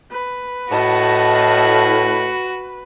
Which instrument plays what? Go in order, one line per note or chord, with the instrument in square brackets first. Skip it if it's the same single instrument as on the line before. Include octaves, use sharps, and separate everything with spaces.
[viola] B4
[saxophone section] A2 [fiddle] F#4 [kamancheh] D#5 A5